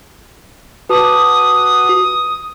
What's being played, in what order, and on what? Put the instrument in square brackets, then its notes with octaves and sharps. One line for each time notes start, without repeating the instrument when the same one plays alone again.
[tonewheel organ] F#4 [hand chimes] B4 A5 D6 [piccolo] D#6